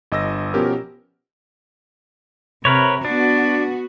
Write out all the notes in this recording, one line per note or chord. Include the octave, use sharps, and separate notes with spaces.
G1 D#5 E6 A#6
B2 F3 B3 C#4 G4 A#4
C3 A#4 B4 C#5
B3 D4 F#4